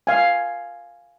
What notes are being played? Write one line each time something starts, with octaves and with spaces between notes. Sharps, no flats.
F5 G#5